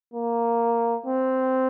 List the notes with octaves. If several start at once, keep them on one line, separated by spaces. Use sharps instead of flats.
A#3
C4